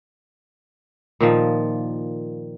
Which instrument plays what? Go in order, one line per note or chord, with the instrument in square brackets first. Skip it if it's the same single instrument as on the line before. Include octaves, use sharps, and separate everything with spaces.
[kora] A#2 D#3 F3